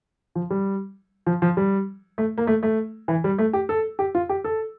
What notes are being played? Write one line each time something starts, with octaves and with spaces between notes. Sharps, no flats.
F3
G3
F3
F3
G3
A3
A#3
A3
A3
E3
G3
A3
G4
A4
G4
F4
G4
A4